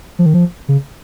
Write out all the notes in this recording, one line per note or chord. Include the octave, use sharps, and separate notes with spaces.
F3
D#3
F3
C#3